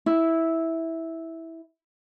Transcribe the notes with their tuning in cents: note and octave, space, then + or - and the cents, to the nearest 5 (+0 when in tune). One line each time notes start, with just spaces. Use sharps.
E4 -10